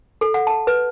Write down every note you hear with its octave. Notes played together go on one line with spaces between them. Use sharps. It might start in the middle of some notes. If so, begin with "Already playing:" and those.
A4
F#5
A5
B4